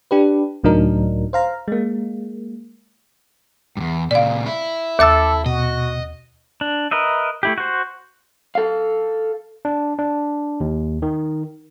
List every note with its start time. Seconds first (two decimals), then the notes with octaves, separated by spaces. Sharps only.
0.11 D4 G4 B4
0.64 C#2 A2 F#3 D4 D#4 A#4
1.33 C5 F5 A#5
1.68 G#3 A#3
3.77 E2 G2
4.11 A#2 C#3 D5 F5
4.46 E4
4.99 D#2 A4 E5 D6 E6 A6
5.46 B2 F#4 D#5
6.61 D4
6.91 A#4 B4 D#5 E5
7.43 A3 E4 G4
7.58 F#4 C5
8.55 A4 F5
9.65 D4
9.99 D4
10.60 D#2
11.02 D#3